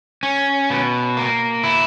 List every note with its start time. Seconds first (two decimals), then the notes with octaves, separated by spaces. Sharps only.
0.23 C#4
0.70 B2
1.17 A#3
1.64 E4